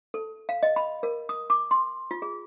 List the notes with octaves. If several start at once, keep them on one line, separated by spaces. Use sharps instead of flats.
A4
F5
D#5
B5
A#4
D#6
D6
C6
F4
G#4